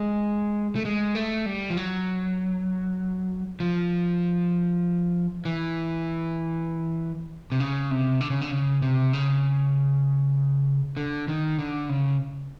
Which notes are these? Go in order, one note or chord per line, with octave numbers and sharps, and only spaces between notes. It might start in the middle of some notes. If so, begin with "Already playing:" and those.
Already playing: G#3
A3
G#3
A3
G3
F3
F#3
F3
E3
C3
C#3
C3
D3
C#3
D3
C#3
C3
C#3
D3
D#3
D3
C#3